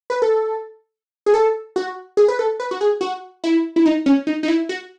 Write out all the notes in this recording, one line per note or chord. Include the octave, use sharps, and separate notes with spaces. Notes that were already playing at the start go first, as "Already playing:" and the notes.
B4
A4
G#4
A4
F#4
G#4
B4
A4
B4
F#4
G#4
F#4
E4
E4
D#4
C#4
D#4
D#4
E4
F#4